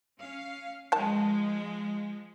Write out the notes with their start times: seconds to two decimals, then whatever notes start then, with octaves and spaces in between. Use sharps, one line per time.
0.18 C#4 F5
0.92 D#3 F3 G#3 A5